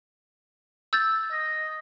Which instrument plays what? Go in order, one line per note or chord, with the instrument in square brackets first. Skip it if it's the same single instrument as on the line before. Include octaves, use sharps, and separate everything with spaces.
[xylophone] E6 G6 A6
[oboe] D#5